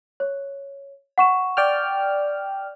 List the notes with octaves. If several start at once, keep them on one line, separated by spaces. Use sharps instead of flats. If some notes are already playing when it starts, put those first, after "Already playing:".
C#5
F#5 C#6 E7
D5 G5 F6